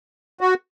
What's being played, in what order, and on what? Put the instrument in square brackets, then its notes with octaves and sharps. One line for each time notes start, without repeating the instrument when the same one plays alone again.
[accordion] F#4